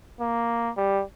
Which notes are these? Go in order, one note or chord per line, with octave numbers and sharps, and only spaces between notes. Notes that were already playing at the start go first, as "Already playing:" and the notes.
A#3
G3